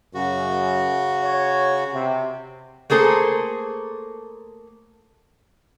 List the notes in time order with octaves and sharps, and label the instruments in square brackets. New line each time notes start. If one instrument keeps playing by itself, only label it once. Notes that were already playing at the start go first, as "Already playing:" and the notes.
[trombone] F#2 [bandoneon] C#3 F#4
[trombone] C#5
C3
[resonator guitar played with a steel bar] A3 A#3 G#4 A4 C5